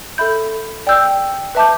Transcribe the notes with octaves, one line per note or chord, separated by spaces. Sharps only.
A4 E5 B5 G6
D5 G5 E6 G6
B4 E5 A5 D6 G6